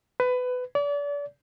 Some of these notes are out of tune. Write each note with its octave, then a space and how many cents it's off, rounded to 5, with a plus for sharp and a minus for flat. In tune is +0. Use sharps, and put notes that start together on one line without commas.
B4 +20
D5 -35